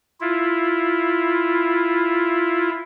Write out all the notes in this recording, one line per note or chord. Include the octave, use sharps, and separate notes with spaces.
E4 F4